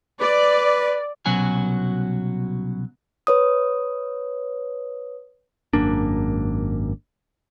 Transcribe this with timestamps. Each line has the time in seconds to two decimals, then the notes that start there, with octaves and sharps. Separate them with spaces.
0.20 B4 D5
1.26 C2 B2 F#3 C#4 F#4 G#5
3.27 B4 C#5 D#6
5.73 G#1 F#2 A#3 D4